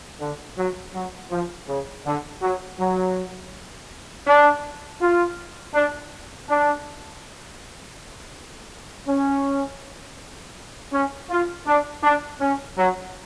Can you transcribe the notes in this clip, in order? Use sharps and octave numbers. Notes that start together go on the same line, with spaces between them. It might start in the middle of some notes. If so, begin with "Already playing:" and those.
D3
F#3
F#3
F3
C#3
D3
F#3
F#3
D4
F4
D4
D4
C#4
C#4
F4
D4
D4
C#4
F#3